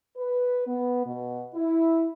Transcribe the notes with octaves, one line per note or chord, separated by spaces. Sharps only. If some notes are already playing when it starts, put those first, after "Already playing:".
B4
B3
B2
E4